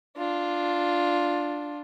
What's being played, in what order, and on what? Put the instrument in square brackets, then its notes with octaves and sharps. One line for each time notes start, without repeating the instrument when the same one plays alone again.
[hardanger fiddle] D4 F4